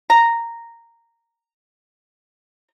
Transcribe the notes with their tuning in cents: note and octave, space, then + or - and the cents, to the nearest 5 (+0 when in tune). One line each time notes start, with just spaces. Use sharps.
A#5 -10